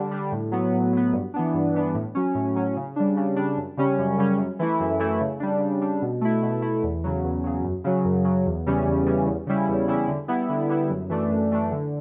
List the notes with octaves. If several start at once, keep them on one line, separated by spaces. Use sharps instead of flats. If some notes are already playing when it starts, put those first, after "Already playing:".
Already playing: D3 G3 D4
G3 D4
A2
F#3 B3
A2
F#3 B3
G2
E3 B3 D4
G2
E3 B3 D4
A2
F#3 C#4
A2
F#3 C#4
C#3
G3 D4
C#3
G3 D4
F#2
C#3 G3 C#4
F#2
C#3 G3 C#4
F#2
E3 A3 E4
F#2
E3 A3 E4
C#3
G3 D4
C#3
G3 D4
B2
A3 E4
B2
A3 E4
E2
C#3 F#3
E2
C#3 F#3
F#2
C#3 F#3
F#2
C#3 F#3
E2
C#3 E3 G3 C#4
E2
C#3 E3 G3 C#4
E2
C#3 G3 C#4 E4
E2
C#3 G3 C#4 E4
D3
G3 B3 E4
D3
G3 B3 E4
F#2
E3 A3 D4
F#2
E3 A3 D4
D3